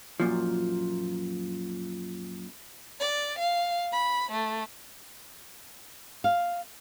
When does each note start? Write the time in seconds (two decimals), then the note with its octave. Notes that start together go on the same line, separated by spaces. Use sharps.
0.20 F#2 A#2 F3
3.00 D5
3.39 F5
3.92 B5
4.31 A3
6.24 F5